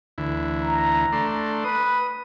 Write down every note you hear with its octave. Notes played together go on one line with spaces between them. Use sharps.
D2 E3
A#5
A3 D4 C6
B4 D#6